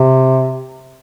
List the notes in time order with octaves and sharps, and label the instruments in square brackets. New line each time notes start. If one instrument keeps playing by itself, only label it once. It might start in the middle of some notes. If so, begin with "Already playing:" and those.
Already playing: [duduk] C3